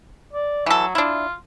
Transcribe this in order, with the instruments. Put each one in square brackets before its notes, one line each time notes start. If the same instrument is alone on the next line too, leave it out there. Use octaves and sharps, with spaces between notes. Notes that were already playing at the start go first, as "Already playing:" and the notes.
[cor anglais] D5
[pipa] E3 A4 [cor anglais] F#3
[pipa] D4 E4 [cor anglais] F4